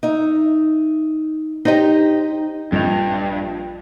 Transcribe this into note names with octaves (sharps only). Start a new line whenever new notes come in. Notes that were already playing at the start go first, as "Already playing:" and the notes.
D#4 E5
D#4 G4 C5 D#5
A#1 G2 D#5 F7